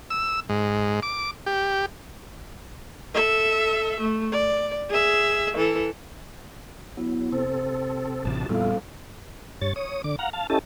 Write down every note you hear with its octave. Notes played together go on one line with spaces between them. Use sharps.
E6
G#2
D6
G4
A4 E5
A3
D5
G#4 E5
E3 A4
F#3 B3 E4
C3 C4 A4 C5
A1 C3 A5
F2 A#2 G3 B3 E4 F4 A4 F5
G2 C#5 A6
C#5 D#6
D3 D6
F5 F#5 A#5
F5 A5
C#4 E4 G4 A4 D#5 A5